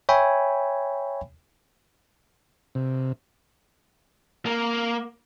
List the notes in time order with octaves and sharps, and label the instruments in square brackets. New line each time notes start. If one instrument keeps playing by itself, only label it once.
[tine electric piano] C#5 E5 G5 G#5 B5
[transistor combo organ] C3
[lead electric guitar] A#3